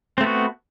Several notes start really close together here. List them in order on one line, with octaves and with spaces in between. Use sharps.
C4 A3 B3 F#4